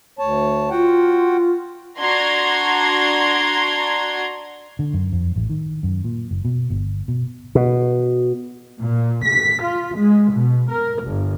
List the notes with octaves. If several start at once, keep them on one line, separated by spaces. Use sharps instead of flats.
D2 C#5 A5
F4 F#4 F#5 G5
D4 F#4 A#5 C6 G#6
D3
F#2
F2
A1
D#3
F#2
A#2
F#1
B2
G1
B2
B2
A#2
B6
F4
G#3
B2
A#4
G1